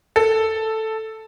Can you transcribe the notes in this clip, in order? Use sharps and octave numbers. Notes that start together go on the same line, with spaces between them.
A4